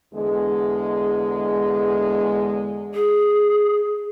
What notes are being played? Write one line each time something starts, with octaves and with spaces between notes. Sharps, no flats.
E2 D3 G#3
G#4